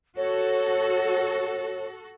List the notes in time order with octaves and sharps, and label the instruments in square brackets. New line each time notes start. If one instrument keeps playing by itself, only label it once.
[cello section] F#4 A4 [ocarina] C#5